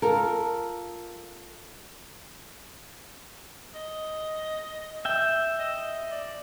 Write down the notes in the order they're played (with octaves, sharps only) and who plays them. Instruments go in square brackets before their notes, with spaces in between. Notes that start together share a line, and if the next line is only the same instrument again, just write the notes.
[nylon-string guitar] F4 A4 A#4
[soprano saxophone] D#5
[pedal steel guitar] E5 G5
[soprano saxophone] D#5
D5